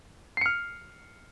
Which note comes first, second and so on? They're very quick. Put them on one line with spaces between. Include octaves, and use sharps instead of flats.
C7 C#7 F6